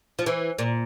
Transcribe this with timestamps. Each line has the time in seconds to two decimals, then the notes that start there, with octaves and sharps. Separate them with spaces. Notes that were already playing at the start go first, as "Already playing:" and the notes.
0.19 F3
0.26 E3
0.58 A#2